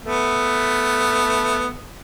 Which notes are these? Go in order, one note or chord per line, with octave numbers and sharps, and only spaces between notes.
A3 B3